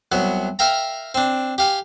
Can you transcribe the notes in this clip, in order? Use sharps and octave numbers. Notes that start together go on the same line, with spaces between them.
C2 F#3 B3
A#4 E5 F5 G5 A#5
C4 D4
G4 F5 G#5